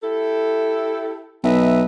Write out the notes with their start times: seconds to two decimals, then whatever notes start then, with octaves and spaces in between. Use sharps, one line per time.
0.03 E4 G4 A4
1.44 B1 B4 D#5 E5